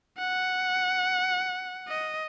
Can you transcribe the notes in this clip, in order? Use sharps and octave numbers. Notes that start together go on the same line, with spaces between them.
F#5
D#5